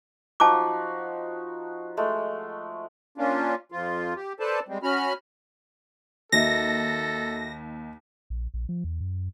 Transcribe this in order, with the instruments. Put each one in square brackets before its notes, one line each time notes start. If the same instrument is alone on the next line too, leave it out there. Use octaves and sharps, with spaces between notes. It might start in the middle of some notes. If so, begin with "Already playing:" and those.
[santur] F3 D#4 F#4 [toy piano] A5 D6
[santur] G#3 A3
[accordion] A#3 C#4 D4 F4
F2 F3 F4
G4
A4 B4 C5 D5 A5
G3 G#3 C4
C#4 F#4 B5 F6
[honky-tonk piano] D#2 [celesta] F#4 D#5 E5 [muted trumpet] A4 [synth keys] A#6
[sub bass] A#1
A#1
F3
E2
F#2